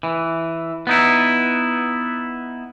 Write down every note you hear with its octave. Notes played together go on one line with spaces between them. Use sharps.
E3
B3 D#4 E4